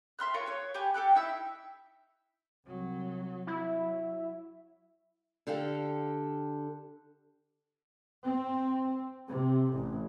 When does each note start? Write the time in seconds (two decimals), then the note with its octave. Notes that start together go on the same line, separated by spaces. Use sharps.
0.19 E5 C6 F6 F#6
0.34 F4 A#4 C#5 C#6
0.46 B3 C#5
0.74 G4 B4 G#5
0.94 G4 A4 D6 F#6
1.15 D#4 E4 E5 E6
2.66 C2 F#3
3.47 F#3 E4
5.47 D3 G4 A4 F5 G5
8.25 C4
9.28 C3
9.73 A1